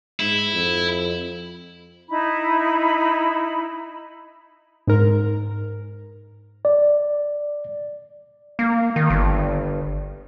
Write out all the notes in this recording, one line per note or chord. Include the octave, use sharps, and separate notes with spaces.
G#2 E4
F2
D#4 E4 B5
G#2 A#4
D5
A#3
D#3
G1